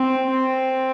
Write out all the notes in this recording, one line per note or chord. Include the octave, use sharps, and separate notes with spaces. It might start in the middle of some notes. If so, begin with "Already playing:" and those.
Already playing: C4
C4